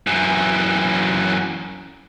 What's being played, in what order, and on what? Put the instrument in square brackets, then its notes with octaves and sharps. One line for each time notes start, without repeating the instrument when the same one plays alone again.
[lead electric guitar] F#2 E3